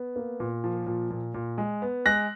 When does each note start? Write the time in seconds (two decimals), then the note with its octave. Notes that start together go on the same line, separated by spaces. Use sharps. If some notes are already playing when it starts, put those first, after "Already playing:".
Already playing: B3
0.16 A#3
0.40 A#2
0.64 F3
0.87 A#2
1.10 A#2
1.34 A#2
1.58 G#3
1.82 B3
2.06 G#3 F#6 A#6